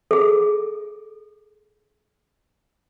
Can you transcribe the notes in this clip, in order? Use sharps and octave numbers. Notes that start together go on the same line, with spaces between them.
G#4 A4